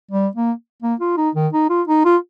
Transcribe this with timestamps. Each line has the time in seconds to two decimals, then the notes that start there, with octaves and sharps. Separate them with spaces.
0.11 G3
0.35 A#3
0.82 A#3
1.00 F4
1.17 D#4
1.35 D#3
1.53 D#4
1.70 F4
1.88 D#4
2.05 F4